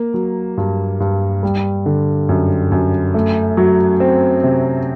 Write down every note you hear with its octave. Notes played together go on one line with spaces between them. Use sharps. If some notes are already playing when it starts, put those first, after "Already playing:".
Already playing: A#3
F#3
G2
G2
G3
D3
F#2
F#2
A3
F#3
C4
C3